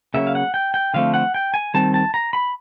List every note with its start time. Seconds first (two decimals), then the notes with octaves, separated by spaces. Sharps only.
0.14 C#3 F#3 A#3 C#4 E5
0.27 F5
0.35 F#5
0.54 G5
0.74 G5
0.94 D3 F3 A3 C4 F5
1.14 F#5
1.34 G5
1.54 G#5
1.74 D#3 G3 C4 A5
1.94 A5
2.14 A#5
2.33 B5